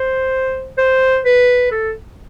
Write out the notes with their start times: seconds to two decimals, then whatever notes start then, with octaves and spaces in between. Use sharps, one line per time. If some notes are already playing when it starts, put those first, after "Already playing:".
Already playing: C5
0.78 C5
1.25 B4
1.71 A4